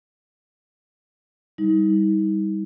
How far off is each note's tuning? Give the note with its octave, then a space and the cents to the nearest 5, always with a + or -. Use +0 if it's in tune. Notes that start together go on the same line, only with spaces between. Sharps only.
G3 +5 D#4 +40